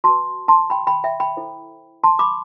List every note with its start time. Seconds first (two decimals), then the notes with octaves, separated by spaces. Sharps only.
0.04 F#4 A5 C6
0.09 B4
0.48 A5 C6
0.70 G5 B5
0.87 G5 B5
1.04 E5 G5
1.20 G5 B5
1.37 E4 A4 C5
2.03 A5 C6
2.19 B5 D6